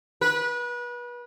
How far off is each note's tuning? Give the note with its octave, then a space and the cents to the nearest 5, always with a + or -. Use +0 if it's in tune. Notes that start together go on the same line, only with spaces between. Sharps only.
B4 -30